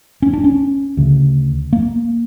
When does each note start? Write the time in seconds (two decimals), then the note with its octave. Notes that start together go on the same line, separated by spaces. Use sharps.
0.22 C#4
0.33 D4
0.44 C#4
0.97 D2 C#3
1.73 A#3